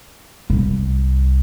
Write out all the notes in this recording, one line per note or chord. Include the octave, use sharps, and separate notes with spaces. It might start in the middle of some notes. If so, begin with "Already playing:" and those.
C2